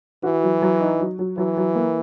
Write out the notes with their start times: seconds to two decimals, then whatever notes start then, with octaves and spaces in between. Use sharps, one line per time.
0.23 E3 F#4
0.43 F#3
0.62 F#3
0.80 D#4
1.00 F#3
1.19 F#3
1.38 E3 F#3
1.57 F#3
1.75 A#3